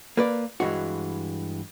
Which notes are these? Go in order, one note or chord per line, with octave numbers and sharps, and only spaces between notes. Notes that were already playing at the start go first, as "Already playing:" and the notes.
A#3 B4 D5
G2 E3 G#3 F#4